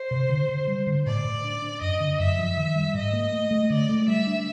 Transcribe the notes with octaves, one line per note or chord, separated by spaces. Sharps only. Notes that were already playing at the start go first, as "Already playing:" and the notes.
Already playing: C5
C3
D3
D3
G3
D3
A2 D5
A2
D4
D4
F#2 D#5
D3
F#2 E5
F3
D#3
G3
G#2 D#5
A#3
A3
A3
D3 D5
A3
G3 E5
D4